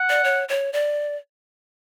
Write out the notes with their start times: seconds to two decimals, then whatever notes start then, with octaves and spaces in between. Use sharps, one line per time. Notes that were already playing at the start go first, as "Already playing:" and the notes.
Already playing: F#5
0.10 D5
0.24 C#5
0.49 C#5
0.73 D5